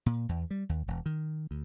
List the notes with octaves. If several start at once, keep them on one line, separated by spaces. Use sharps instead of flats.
A#2
E2
G3
D#2
E1
D#3
D2